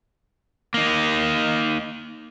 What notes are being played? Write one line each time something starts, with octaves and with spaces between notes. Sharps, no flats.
A#3 D#4